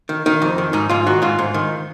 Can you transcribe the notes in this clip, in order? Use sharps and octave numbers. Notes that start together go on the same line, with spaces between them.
D#3
D#3 D#4
F2
D#3
G#2 D#4
G#2 F4
D#3 F#4
G#2 F4
G#2
D#3